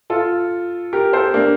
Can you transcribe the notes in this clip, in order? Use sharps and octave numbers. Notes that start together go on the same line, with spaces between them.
F4 A4
G4 A#4
A4 C5
A#3 D4